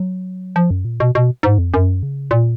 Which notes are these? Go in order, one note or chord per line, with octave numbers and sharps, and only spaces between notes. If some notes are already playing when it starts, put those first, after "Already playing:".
Already playing: F#3
F3
F#2
A#2
B2
B2
G#2
F2
F#2
C#3
A#2